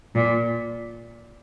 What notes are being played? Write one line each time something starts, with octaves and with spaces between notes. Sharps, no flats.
A#2